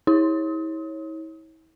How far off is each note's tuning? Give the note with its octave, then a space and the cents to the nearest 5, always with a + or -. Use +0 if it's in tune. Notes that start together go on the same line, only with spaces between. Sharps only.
E4 -40 C#5 -20 D#6 +35